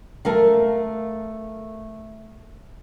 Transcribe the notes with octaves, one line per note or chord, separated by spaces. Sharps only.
A3 A#4 F5